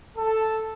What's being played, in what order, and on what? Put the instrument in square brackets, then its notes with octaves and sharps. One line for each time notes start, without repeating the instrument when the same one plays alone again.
[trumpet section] A4